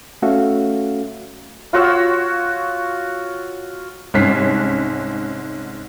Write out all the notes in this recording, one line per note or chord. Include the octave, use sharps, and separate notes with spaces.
A3 C#4 F#4 A4 E5 F5
F4 F#4 C#5 E6
C2 G#2 C#4 B6 C7